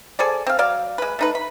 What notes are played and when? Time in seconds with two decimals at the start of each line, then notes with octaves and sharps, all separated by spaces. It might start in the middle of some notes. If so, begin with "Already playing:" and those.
0.19 G#4 A4 C5 D5
0.47 C4 F5
0.59 F#3 D5 F5
0.98 G#3 B4
1.19 A3 D#4 B4
1.35 B5